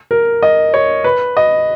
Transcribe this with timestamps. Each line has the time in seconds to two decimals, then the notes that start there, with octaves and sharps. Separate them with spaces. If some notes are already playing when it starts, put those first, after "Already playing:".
0.11 A#4
0.42 D#5
0.74 C#5
1.04 B4
1.37 D#5